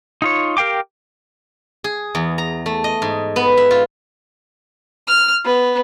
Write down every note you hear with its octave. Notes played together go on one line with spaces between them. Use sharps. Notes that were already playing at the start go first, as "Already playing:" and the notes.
D#4 F4 C#5
G4 A#4 F5 G5 D6
G#4
E2
A#5
A3
D#5
G#2
B3
E5
F4
F6
B3